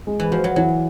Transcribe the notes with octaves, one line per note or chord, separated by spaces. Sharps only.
G#3
E3
F3 F#4
F#3
E3 F#3